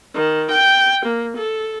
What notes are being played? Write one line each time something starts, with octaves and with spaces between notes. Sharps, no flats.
D#3
G5
A#3
A4